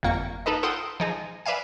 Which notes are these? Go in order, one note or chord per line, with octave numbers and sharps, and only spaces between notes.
G1 F2 A#3 C#6
D#4 A4 B4 D#5
F4 A4 F#5 G5 C6 D#6
F3 D#4 G#4
B4 D5 E5 F5 G#5